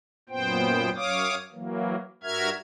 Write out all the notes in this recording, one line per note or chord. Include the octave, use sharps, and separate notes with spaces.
F#2 A#2 B3 C5 G5
F#2 C#5 F5 D6 D#6
E3 F#3 A#3
G2 F#4 A#4 E5 F6 G#6